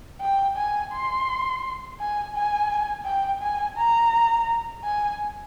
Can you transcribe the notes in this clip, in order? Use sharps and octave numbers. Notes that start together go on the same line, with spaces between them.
G5
G#5
C6
G#5
G#5
G5
G#5
A#5
G#5